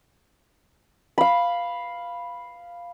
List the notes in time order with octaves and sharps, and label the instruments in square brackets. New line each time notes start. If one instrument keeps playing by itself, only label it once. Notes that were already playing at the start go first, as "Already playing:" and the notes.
[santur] F5 B5